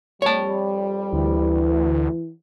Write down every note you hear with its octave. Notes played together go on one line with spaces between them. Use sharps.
F2 G3 C#5 A5
D2 E3